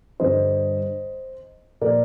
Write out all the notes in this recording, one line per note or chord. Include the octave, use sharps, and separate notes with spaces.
G2 D3 G3 C5 D#5
A#2 F3 A#4 D5